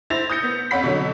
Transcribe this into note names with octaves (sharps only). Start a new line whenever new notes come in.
E4 C5 A6 A#6 F7
D#6 G6 A#6 C#7
B3
F2 C#4 F#5 B5 B6
B2 D3 F#3